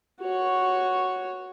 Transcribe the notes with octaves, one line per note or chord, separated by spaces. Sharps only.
F#4 C#5